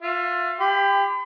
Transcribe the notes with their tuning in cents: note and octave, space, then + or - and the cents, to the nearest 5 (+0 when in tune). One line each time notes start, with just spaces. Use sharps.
F4 +25 E5 +35
G4 +20 B5 +45